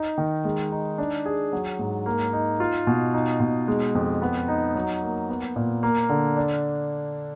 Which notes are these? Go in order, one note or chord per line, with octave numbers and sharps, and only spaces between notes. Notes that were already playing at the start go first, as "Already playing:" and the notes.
Already playing: D#4
D#3
G#3
D#4
D4
G#4
F#3
G#2
A#3
D#4
F4
B2
D#4
B2
G#3
F2
B3
D#4
F#3
A#3
B3
A#2
A#3
D3
D4